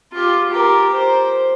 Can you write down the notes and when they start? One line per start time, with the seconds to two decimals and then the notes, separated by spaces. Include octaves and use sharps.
0.13 F4 G4
0.50 G4 A#4
0.94 C5